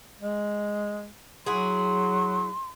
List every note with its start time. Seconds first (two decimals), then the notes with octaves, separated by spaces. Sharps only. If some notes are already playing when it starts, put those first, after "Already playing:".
0.20 G#3
1.46 F#3 E4 F#4 G#4 C6